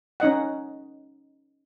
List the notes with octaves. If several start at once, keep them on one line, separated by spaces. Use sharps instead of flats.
C#4 D#4 D#5 F#5